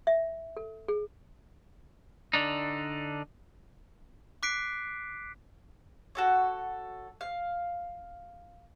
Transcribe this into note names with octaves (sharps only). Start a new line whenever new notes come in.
E5
A4
G#4
D3 D4 D#4
D6 F#6 B6 C7 D7
F#4 A4 C#5
F5